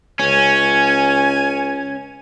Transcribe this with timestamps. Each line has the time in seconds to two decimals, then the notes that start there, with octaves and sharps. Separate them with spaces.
0.19 C#2 C#4 G#5